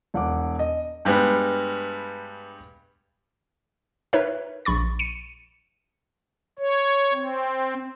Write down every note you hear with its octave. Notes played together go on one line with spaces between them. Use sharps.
E1 F#5 D6
D#5
G2 G3 G#3 B3
D#4 A#4 B4 C#5 E5
A#1 B5 C#6 A6
C#7 D#7
C#5
C4